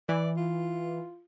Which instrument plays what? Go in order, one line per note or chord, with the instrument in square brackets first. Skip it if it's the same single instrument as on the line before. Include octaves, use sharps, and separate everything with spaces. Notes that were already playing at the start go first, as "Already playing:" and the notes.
[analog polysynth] E3 [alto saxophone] D5
[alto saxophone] F4